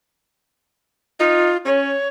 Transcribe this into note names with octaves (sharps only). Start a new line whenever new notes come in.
D#4 F4
C#4 C#5